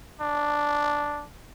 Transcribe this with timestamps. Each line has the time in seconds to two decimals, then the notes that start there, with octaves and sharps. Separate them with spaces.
0.21 D4